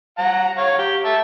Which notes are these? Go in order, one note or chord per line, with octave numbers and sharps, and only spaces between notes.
F#5 A#5
C#5 F5
G4
E5 A5